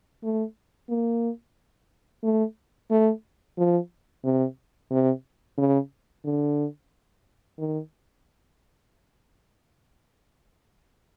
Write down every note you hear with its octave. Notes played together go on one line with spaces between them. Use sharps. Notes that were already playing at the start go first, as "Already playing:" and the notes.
A3
A#3
A3
A3
F3
C3
C3
C#3
D3
D#3